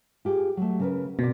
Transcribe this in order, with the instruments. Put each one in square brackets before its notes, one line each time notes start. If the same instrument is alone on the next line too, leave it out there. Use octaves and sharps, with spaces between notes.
[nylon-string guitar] F4 G4 G#4
F#3 A3
C#3 A#4 B4
[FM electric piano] B2 [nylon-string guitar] C4 A#4 D5